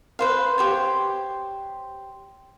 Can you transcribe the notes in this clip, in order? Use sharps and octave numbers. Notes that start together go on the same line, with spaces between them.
B4 C5 F5
G4 C5 C#5